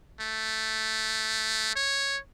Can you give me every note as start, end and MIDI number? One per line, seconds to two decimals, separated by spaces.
0.20 1.72 57
1.75 2.18 73